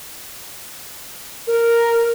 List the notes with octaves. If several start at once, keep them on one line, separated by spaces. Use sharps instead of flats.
A#4